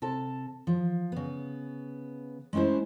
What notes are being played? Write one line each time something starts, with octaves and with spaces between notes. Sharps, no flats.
C3 A4 A5
F3
C#3 B3
G#3 A3 C#4 E4 C5